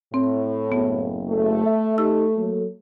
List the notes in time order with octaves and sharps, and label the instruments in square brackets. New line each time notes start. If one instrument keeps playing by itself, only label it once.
[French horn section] A2 [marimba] C4
[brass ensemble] F#1 [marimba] B3
[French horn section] A3
[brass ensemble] E5
[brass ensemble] D#4 G4 [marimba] E6
[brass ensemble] F#3 A#3 A4